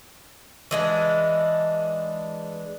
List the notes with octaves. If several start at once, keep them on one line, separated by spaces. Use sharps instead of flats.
E3 G#3 D4